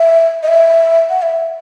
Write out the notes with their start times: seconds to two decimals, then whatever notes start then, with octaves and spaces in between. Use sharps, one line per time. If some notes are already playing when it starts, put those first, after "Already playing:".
Already playing: E5
0.43 D#5
0.48 E5
1.10 F#5
1.22 E5